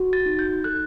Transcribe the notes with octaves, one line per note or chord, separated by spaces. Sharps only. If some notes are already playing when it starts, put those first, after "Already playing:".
Already playing: F#4
A6
D#4
G6
A4 F#6